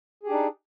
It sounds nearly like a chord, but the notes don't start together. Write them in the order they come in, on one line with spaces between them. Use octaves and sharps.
G#4 G4 D4 D#4